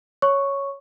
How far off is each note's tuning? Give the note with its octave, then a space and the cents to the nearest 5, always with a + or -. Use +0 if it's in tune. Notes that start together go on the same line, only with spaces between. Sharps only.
C#5 +0 C#6 +0